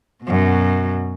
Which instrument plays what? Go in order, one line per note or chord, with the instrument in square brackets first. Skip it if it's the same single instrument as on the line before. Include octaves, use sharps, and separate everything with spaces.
[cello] F#2 B2